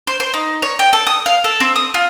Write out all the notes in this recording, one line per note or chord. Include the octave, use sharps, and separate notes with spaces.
C5
C5
D#4
C#5
G5
A4
D#6
F5
A4
C4
D#6
F4